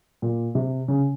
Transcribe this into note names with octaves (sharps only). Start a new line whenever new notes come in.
A#2
C3
C#3